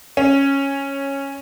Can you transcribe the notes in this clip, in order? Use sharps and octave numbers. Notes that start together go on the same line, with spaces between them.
C#4